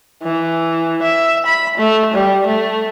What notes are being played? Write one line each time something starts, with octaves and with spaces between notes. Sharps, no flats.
E3
E5
B5
A3
G3
A3